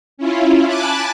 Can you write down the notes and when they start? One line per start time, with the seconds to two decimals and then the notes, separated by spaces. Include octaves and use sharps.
0.17 C#4 E4 F4
0.66 G#5 A5 B5 D6 F#6 A6